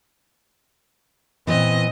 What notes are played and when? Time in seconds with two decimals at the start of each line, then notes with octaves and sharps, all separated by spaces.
1.47 A#2 E3 B3 C4 D#5